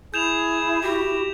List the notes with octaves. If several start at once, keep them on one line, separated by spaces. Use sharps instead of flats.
E4 G#4 G6 E7 F7
F#4 G4